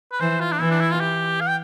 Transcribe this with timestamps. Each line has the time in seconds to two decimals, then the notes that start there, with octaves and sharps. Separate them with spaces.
0.12 B4
0.20 E3 C5
0.40 F4
0.52 D4
0.60 E3 E4
0.71 D4
0.80 E4
0.91 F4
1.00 G4
1.41 F5
1.48 G5